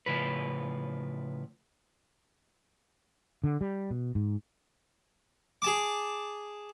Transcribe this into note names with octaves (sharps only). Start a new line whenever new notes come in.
A2 C#3 F3 B4
D3
G3
B2
G#2
G#4 A5 D6